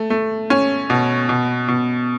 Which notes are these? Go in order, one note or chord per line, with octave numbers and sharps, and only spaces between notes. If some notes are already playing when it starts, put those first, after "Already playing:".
Already playing: A3
A3
C#4
B2
B2
B2